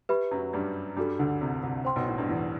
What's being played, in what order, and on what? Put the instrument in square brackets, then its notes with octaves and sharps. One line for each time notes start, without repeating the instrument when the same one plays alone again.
[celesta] G4 B4 E5 B5
[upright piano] F#2 F#3
G2 G3
[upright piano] G2 G3 [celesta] D4 F#4 A4
[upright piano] D2 D3
C2 C3
C2 C3
[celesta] C5 G5 C6
[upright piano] B1 B2
A2
G2
E2 E3